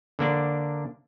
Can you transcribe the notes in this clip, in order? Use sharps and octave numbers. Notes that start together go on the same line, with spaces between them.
D3 A#3 D4